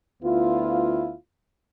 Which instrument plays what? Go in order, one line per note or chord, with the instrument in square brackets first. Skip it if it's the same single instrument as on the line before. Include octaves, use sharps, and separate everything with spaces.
[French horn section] D2 B3 E4 F4